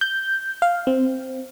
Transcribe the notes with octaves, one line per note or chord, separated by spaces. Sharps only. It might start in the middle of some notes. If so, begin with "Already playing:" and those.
G6
F5
C4